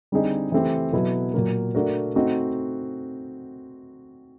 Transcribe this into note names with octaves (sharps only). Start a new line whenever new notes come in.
D3 G3 C4 D#4 G#4
E3 A3 C4 E4 G4
B2 F#3 B3 E4 A4
A#2 F#3 A#3
A3 D4 F#4 A#4
A3 C4 D#4 F#4